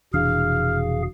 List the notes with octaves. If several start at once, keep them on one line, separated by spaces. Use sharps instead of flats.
F1 B2 E3 D4 G#4 F5 F6